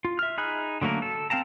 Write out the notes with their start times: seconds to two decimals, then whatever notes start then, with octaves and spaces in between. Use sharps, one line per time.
0.05 F4
0.19 E5 F6
0.38 D#4 G#4 B5 F#6
0.82 D3 F#3 A3 A#3 A#4
1.02 A4
1.30 C4 F5 G5 A5 A#5